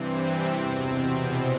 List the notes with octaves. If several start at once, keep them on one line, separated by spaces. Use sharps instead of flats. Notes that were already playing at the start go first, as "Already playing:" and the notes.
Already playing: G2 C3 E3 C4
E2 B2